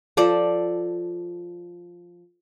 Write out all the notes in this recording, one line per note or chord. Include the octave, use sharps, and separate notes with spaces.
F3 A4 D5